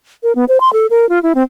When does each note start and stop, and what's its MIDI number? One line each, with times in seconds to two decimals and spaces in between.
0.23 0.32 70
0.35 0.45 59
0.49 0.60 72
0.60 0.71 84
0.73 0.86 69
0.90 1.08 70
1.09 1.21 65
1.23 1.33 64
1.35 1.43 60